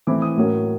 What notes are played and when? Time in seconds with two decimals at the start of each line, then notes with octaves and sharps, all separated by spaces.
0.07 E3 A3 C4 E4 D6
0.22 D#6
0.37 A2 F#3 A#3 C#4